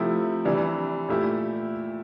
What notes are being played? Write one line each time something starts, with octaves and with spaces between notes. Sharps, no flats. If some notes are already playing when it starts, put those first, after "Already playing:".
Already playing: C3 F3 A3 E4 G4
C3 E3 G3 D4
A#2 A3 E4 G4